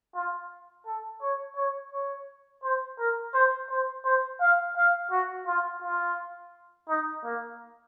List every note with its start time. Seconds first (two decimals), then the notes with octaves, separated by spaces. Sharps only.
0.15 F4
0.86 A4
1.22 C#5
1.56 C#5
1.92 C#5
2.63 C5
2.99 A#4
3.34 C5
3.70 C5
4.05 C5
4.41 F5
4.77 F5
5.11 F#4
5.47 F4
5.82 F4
6.89 D#4
7.25 A#3